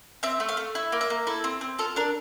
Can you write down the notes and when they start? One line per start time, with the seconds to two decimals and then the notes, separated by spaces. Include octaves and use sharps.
0.23 C4 E5
0.40 A3
0.49 F5
0.57 A3
0.75 E4
0.92 A#3
1.01 E5
1.10 A#3
1.27 E4 A4
1.44 C4
1.61 C4
1.79 F4 A4
1.96 D4 A#4